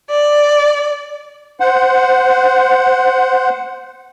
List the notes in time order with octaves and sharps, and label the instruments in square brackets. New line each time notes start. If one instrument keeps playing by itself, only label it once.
[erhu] D5
[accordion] C5 F#5